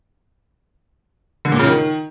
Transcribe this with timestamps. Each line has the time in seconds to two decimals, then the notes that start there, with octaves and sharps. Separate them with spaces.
1.45 D3
1.52 A#2
1.59 C#3
1.66 D#3